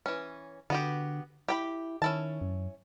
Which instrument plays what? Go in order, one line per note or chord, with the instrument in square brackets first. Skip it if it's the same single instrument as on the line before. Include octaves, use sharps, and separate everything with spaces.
[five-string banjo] E3 C#4
[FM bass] D3 [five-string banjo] B3 F#4 G4
[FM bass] E4 [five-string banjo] G4 G5 B5
[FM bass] D#3 [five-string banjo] C#4 E4 A5
[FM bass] F#2